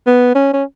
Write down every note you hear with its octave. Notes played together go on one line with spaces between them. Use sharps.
B3
C#4
C#4